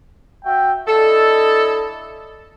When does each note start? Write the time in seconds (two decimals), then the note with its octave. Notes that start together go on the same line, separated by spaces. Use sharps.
0.44 F#4 E5 G5
0.87 D4 E4 A4 D#5